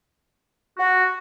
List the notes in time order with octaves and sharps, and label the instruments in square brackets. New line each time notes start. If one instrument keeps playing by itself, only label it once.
[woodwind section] F#4